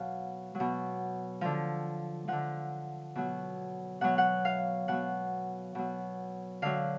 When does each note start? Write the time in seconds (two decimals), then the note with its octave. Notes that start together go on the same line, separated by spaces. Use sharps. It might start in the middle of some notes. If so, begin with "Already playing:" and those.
Already playing: B2 F#3 F5
0.55 F#3
0.60 B2
1.41 D3 F3
2.28 D3 F3 F#5
3.15 B2 F#3
4.01 B2 F#3 F#5
4.18 F#5
4.45 F5
4.88 B2 F#3 F#5
5.75 B2 F#3
6.62 D3 F#3 F5